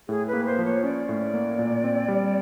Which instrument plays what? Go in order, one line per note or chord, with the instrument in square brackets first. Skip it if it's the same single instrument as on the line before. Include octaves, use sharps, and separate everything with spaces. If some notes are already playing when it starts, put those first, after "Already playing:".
[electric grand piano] A2 [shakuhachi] G#4
[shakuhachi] B4
[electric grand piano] A#3
[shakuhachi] C5
[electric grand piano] F3
[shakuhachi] C#5
[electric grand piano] C#4 [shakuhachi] D5
[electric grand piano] A2
A#3
A#2
C4
G3